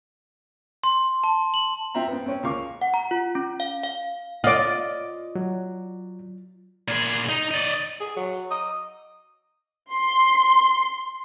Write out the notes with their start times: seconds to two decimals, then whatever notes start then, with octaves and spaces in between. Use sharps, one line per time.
0.84 C6
1.24 A5
1.54 F#7
1.95 C4 F4 E5 G5 A#5
2.08 B3 C4
2.26 C4 C#4
2.43 C#2 A#3 F4 F5 C#6 D6
2.82 F#5
2.94 A#5
3.11 F4
3.35 C#4
3.60 F5
3.83 F5
4.44 F4 D5 D#5
5.35 F#3
6.88 A#2 G#4
7.29 D#4
7.51 D5 D#5
8.00 G#4
8.16 F#3
8.51 D#5
9.92 C6